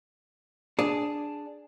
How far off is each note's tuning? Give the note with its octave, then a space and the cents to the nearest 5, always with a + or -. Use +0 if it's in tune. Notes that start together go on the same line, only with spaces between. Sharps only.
D4 +0 G#4 +0